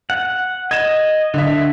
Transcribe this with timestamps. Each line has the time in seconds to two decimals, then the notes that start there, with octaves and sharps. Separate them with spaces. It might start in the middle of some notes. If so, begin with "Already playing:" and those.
0.10 F#5
0.71 D#5 G#6 E7
1.34 D3 E5